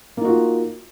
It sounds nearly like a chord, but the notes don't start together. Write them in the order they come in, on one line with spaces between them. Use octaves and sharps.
A#3 D#4 F#4 F4